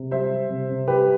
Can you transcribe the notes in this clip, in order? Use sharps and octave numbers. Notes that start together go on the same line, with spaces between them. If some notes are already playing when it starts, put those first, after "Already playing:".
Already playing: C3
G3 C5 E5
G3
C3
C3
G3 G4 B4